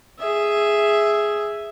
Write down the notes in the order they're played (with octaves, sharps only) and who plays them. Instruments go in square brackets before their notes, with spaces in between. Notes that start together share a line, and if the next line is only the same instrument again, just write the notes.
[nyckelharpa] G#4 E5